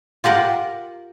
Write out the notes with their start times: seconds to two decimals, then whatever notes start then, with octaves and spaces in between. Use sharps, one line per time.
0.24 F4 G4 A#4 F#5